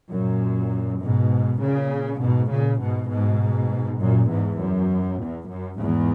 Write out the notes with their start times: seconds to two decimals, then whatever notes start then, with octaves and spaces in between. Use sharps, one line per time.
0.12 F#2 A#2
1.01 G#2 B2
1.61 A#2 C#3
2.20 G#2 B2
2.51 A#2 C#3
2.81 G#2 B2
3.10 G#2 B2
4.00 F#2 A#2
4.29 E2 G#2
4.59 F#2
5.19 E2
5.49 F#2
5.79 E2 G#2